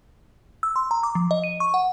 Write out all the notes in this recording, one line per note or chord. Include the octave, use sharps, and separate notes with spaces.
E6
C6
A#5
D6
F3
D#5
D#7
C#6
F#5